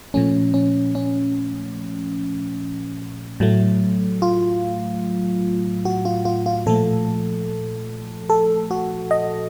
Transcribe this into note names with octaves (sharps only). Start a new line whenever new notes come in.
A#2 F3 A3 C#4
C#4
C#4
A2 F#3 A3
F4
F#4
F4
F4
F4
A#2 F3 A3 A4
A4
F#4
D#5